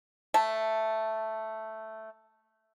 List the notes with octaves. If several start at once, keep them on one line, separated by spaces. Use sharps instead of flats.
A3 A5